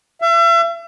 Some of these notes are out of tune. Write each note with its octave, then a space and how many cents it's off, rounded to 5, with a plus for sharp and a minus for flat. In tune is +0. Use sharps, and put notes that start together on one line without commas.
E5 +40